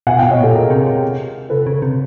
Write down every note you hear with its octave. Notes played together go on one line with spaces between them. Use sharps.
B2 F#5 G#5
F5 G5
B2
C#5 D#5
A#2 G4 A4
B2 G#4 A#4
C3
C3
C#3 A4 B4
C#3
C3